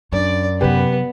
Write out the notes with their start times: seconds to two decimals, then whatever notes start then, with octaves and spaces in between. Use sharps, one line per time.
0.12 F#2 D4 D5
0.61 C3 F#3 B3 G4 B4